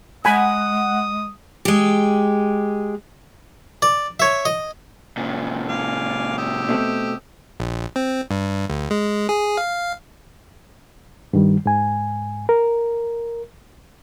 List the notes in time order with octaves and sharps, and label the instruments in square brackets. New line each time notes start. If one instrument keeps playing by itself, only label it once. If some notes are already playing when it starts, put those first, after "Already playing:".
[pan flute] G#3 [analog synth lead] F#5 [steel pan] G#5 B5 [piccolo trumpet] D#6
[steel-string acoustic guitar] G#3 G4
[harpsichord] D5
C#5 E5
D#5
[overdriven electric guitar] A#2 C#3
[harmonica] F5 G#5 D6
G4 D#6 E6
[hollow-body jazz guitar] B2 A3 C4
[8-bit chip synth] A#1
C4
G2
D2
G#3
G#4
F5
[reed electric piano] G2 D#3 G3
G#2 G#5
A#4